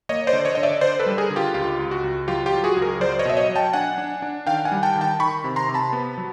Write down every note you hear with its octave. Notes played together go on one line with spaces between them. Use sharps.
A#3 C#5 D#5
C5 D5
D3
C#5 D#5
D3 D#5
D5 E5
D3 C5 D5
A4 B4
G3
G#4 A#4
D3
F4 G4
C#2 F4 G4
C#2
F#4
C#2
F#3 F4 G4
F4 G4
F#3
F#4 G#4
C#2
G#4 A#4
F#3 C5 D5
C#5 D#5
B2 E5
C#5 D#5
F#3
G5 A5
D4 F#5 G#5
D4
D4
D#3 F5 G5
F#5 G#5
G3
G5 A5
D#3
G5 A5
D#3 B5 C#6
C3
A#5 C6
C3
A5 B5
B3
F#3